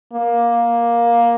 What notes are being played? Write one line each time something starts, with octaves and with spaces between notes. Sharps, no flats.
A#3